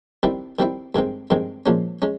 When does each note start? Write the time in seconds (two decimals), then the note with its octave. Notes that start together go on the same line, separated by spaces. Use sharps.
0.23 D#3 G3 C4 E4
0.59 D#3 G3 C4 E4
0.95 G2 D#3 G#3 C4
1.30 G2 D#3 G#3 C4
1.66 A#2 F3 G#3 C#4
2.02 G#3 C#4